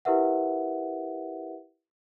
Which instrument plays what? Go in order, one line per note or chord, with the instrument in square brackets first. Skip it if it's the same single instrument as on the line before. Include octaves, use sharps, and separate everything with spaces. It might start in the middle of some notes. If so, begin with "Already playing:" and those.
[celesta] E4 G4 A#4 B4 E5 F#5